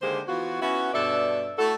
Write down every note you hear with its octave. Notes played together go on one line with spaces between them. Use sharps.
D3 D#3 G#3 A#3 G4 C5
E3 B3 F4 F#4
B3 C#4 E4 F#4
G2 B2 D4 A4 D5 E5
A3 E4 F#4 A4